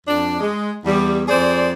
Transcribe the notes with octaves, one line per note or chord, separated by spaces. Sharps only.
F2 D4
G#3
E2 G3
F2 G#4 C5 D5